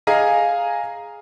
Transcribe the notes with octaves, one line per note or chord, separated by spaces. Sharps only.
G#4 D#5 F5 G#5 A#5